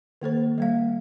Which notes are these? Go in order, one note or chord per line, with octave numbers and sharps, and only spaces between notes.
D#3 A#3 A4 C5
G3 A#3 F5